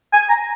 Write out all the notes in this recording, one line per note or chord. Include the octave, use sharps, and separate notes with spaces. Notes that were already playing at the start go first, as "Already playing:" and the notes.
G#5
A#5